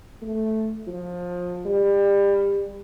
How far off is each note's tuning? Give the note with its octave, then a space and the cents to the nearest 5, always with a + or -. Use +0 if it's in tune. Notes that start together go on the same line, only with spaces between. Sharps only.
A3 -5
F3 +25
G3 +25